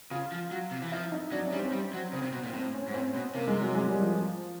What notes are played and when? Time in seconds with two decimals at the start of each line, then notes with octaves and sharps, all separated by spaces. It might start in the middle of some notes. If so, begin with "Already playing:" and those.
0.11 C#3 F4
0.32 F3
0.51 F#3
0.71 C3
0.82 E3
0.92 F3 E4
1.12 D#4
1.32 F#3 D4
1.46 C#4
1.53 G3
1.59 C4
1.72 G3
1.93 F#3
2.13 C#3 C4
2.23 C3
2.33 B2
2.44 A#2
2.53 A2 C4
2.74 C#4
2.88 G#2
2.94 A2 C4
3.15 B2
3.35 C3 A#3
3.48 G#3
3.61 F#3
3.75 G#3
3.88 G3
4.02 F3